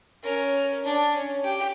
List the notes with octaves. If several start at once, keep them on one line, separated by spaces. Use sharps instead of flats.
C#4 A#4
D4
C#4
G4